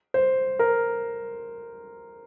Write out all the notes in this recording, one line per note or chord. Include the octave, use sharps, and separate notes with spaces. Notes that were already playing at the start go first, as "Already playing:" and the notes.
C5
A#4